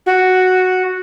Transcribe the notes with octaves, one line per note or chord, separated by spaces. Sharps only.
F#4